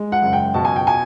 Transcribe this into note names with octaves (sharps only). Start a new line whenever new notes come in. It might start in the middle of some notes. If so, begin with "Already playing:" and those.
Already playing: G#3
F#5
F#1
G5
B2 A5
G#5
G5
G#5